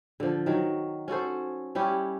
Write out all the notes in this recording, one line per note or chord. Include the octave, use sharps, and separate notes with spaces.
D3 F3
D#3 F#3 F#4
C#4 F#4 A4 C5
G3 C#4 E4 G4